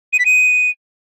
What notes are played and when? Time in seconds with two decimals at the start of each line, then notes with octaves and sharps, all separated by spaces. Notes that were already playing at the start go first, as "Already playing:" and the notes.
0.13 D#7
0.19 B6
0.26 D#7